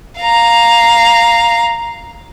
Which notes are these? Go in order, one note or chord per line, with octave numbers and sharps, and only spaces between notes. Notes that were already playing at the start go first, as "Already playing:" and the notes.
F5 A#5